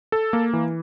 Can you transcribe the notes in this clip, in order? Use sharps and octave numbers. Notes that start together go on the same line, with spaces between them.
A4
A#3
E3